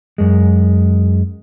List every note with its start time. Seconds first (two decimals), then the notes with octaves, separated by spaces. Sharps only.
0.18 F#2 G#3